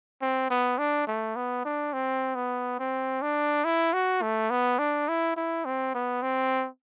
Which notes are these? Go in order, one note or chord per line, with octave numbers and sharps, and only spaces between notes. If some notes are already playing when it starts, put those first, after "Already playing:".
C4
B3
D4
A3
B3
D4
C4
B3
C4
D4
E4
F#4
A3
B3
D4
E4
E4
C4
B3
C4